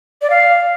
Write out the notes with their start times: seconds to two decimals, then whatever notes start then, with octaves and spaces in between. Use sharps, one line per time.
0.22 D5
0.30 F5